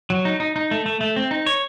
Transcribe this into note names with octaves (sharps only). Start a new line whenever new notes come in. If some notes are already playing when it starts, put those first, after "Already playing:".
F#3
D#4
D#4
D#4
A3
A3
A3
C4
D#4
C#5